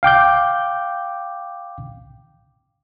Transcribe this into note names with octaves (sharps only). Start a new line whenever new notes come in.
F5 G5 D6 G6